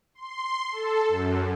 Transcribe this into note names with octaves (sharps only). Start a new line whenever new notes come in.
C6
A4
F#2